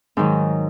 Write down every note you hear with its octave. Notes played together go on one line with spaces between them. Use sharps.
G#2 D#3 F#3 D#4